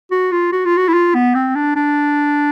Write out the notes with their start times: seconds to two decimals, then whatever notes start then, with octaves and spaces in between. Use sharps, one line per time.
0.11 F#4
0.32 F4
0.52 F#4
0.65 F4
0.77 F#4
0.88 E4
0.93 F4
1.15 B3
1.35 C4
1.55 D4
1.76 D4